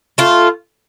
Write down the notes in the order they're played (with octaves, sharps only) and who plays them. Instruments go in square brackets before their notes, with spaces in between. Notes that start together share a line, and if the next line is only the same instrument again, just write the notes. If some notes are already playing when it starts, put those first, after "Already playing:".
[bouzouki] A3 F4